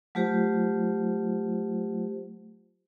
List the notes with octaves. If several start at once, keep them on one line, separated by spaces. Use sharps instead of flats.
F#3 A3 F4 G4 C5